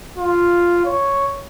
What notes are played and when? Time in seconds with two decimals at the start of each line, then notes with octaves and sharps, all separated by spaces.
0.18 F4
0.85 C#5